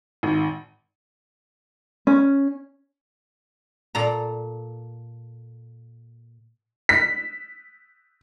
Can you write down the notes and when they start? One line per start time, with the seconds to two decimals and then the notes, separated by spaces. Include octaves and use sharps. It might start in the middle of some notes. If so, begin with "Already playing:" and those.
0.23 G#1
2.07 C#4
3.95 A#2 A4 A#5
6.89 B6